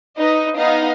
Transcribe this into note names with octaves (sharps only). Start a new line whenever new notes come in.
D#4 B4 D#5
B3 D#4 D#5 F5